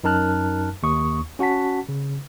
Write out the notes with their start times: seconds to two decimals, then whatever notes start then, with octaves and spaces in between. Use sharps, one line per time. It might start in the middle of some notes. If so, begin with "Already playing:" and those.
0.04 F#2 D#4 A#4 A5 F6 F#6
0.83 D#2 C#6 D#6
1.39 C#4 F#4 F#5 A5 B6
1.89 C#3